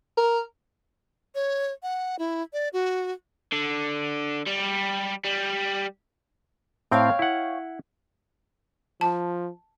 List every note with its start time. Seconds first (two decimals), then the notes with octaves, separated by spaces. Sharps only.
0.17 A#4
1.35 C#5
1.83 F#5
2.19 E4
2.53 D5
2.73 F#4
3.53 D3
4.47 G3
5.25 G3
6.91 A2 C4 C#5 F5 G5
7.19 E4 F#5
9.01 F3 A5